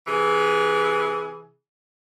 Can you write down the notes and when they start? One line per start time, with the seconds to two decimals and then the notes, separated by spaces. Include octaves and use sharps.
0.07 C3 E3 G#4